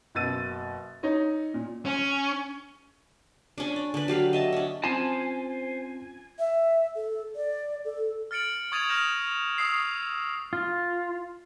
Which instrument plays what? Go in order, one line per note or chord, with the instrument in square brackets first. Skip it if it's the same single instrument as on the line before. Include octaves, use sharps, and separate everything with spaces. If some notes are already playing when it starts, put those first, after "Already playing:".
[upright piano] F#1 B2 E6 A6 D#7
D#4 C#5 D#5
A#2
[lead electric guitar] C#4
[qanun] C#4 D4
D5
D3 B4
F#3 G4 F5 B5
D#5 E5 A5
C#4 D4
[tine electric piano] C4 C#4 F4 [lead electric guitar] C5 A5 [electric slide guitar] G#5
[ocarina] E5
A4
D5
A4
[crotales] F6 A6 C#7 D7 F#7
C#6 D#6 G#6 A6 D#7 F7
D#6 F6 G6 A#6 E7 F7
C#6 D#6 E6 C7
[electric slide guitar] F4